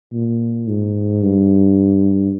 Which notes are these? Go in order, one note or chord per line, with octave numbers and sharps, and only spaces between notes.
A#2
G#2
G2